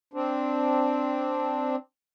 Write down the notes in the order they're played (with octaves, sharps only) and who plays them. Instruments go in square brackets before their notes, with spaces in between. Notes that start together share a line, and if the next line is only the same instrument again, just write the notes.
[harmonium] C4 D4